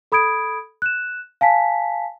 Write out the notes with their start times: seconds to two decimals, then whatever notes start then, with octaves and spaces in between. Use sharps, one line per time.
0.12 A4 B5 D#6 G#6 D7
0.82 F#6 E7
1.41 F5 G#5 A5 B6